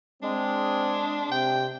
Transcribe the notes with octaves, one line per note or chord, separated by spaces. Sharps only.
G#3 C4 D4
C3 G5